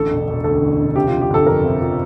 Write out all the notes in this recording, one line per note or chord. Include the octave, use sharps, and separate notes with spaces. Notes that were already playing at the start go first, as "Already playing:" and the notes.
Already playing: A1 D3 A4
E1
E1
D2 A4
D3
E1
C3 G4
F3 F4
G4
G1 A4
F2 A#4
C3
F3